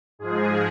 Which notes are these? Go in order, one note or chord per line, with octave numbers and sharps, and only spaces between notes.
G#2 F3 G#3 G#4